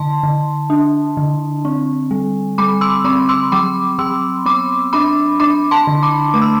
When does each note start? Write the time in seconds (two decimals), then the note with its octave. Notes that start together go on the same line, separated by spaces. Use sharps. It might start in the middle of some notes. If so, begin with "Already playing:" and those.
Already playing: D3 A5 C6
0.23 D3
0.70 D4
1.17 D3
1.65 C4
2.11 G3
2.58 G3 B5 D6
2.81 C6 E6
3.05 C4 B5 D6
3.29 C6 E6
3.52 F#3 B5 D6
3.99 F#3 C6 E6
4.46 B3 B5 D6
4.93 D4 B5 D6
5.40 D4 B5 D6
5.71 A5 C6
5.87 D3
6.03 B5 D6
6.34 A3 D6
6.42 E6